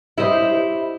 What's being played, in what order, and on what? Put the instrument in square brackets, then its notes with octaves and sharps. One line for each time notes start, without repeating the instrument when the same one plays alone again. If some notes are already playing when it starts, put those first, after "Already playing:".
[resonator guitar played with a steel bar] E4 [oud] G4 C5 D#5